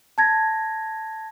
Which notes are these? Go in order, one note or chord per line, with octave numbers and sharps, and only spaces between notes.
A5 G#6 A#6